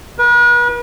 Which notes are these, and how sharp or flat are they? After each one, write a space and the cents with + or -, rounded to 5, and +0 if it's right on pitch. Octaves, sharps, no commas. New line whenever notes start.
B4 -40